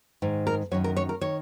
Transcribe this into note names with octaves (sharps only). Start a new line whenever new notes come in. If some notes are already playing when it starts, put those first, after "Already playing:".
G#2 D#3
A#4
F#2 D#3 C#5
A#4
C#5
A#4
D#3 C#5